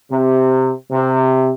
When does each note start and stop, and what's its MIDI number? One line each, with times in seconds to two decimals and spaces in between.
0.11 0.70 48
0.91 1.51 48